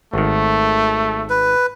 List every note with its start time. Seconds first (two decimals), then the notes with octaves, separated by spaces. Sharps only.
0.13 G#1 D#3 A3
1.30 B4